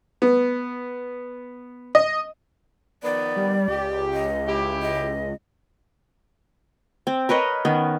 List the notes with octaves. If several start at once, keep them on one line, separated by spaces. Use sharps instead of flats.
B3
D#5
D#3 F3 B3 D5
G3
C#2 G4
D#5
E4 G4
D#5
C4
A#4 B4 C#5 D#5
D#3 B3 C#4